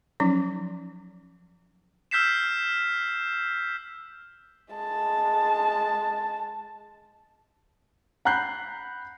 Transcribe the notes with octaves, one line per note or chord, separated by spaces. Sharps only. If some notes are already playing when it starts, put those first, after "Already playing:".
F3 F#3 C#4 D#4
E6 F6 G6 B6 C7 E7
G#3 A5
F#5 A#5 B5 F#6 G6 C7